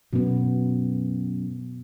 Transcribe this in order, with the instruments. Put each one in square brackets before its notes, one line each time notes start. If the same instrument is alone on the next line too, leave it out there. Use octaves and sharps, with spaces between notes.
[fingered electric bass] F#2 [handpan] B2 B3